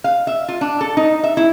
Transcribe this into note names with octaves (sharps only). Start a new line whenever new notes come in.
F5
E5
F4
D4
A4
D#4
E5
E4